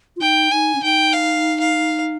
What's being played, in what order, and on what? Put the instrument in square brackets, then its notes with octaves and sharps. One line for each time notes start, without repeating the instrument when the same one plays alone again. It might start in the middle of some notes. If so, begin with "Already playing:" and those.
[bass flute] F4
[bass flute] D#4 [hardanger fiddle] G5
[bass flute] D#4 [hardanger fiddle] G#5
[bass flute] C#4
[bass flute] D#4 [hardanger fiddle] G5
[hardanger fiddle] F5
F5